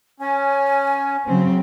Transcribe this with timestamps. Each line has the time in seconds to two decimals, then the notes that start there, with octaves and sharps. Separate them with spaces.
0.20 C#4 G#5
1.27 C#3 F#3 C4